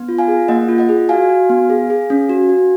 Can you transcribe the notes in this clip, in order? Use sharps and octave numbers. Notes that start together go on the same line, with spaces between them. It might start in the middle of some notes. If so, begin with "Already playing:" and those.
Already playing: B3
F4
F5 G#5
G#4
A#3 D#5 F#5
F4
D#5 F#5
G#4
F#4 F5 G#5
F#4
B3
G#4
G#4
C#4
F#4
F#4